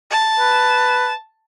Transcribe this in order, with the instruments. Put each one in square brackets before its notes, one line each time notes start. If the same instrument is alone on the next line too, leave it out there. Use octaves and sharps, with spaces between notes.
[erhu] A5
[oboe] B4